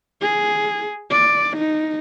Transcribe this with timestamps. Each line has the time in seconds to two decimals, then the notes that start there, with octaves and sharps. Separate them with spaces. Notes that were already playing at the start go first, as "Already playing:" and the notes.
0.22 G#4
1.10 D5
1.57 D#4